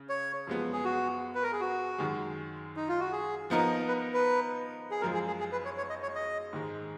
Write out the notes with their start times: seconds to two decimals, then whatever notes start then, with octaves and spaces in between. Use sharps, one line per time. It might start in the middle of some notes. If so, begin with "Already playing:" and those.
Already playing: C#3
0.09 C#5
0.47 F#2 F3 G#3 B3
0.73 G#4
0.85 F#4
1.35 B4
1.43 A#4
1.52 G#4
1.60 F#4
1.98 F#2 D#3 G#3
2.76 D#4
2.89 F4
3.00 F#4
3.12 G#4
3.50 F3 B3 D#4 A#4
3.88 B4
4.13 B4
4.91 G#4
5.01 F#2 F3 G#3 A#4
5.14 G#4
5.27 G#4
5.39 G#4
5.52 B4
5.65 C#5
5.77 C#5
5.90 D#5
6.02 C#5
6.15 D#5
6.53 G#2 D#3 G#3